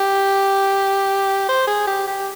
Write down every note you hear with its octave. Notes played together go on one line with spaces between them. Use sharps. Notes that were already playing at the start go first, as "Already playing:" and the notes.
Already playing: G4
C5
G#4
G4
G4